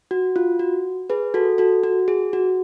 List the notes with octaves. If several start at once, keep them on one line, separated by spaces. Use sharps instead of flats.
F#4
F4
F#4
G#4 B4
F#4 A4
F#4 A4
F#4
G#4
F#4